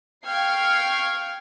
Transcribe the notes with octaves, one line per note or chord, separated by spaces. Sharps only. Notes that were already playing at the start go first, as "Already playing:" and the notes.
F5 G5 C#6 F6 G#6 C7